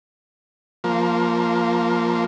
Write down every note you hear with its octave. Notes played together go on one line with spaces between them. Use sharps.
F3 A#3